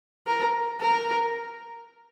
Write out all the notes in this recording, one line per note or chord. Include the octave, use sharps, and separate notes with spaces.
A#4
A#4